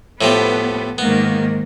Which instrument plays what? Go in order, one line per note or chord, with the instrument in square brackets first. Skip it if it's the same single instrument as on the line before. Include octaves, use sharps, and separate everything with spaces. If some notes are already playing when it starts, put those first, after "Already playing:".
[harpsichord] A2 F3 G4 [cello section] B3
[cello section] G#2 D#3 A#3 [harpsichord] B3